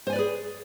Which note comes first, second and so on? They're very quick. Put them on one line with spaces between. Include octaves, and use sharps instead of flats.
C5 G#5 D5 B4 G#4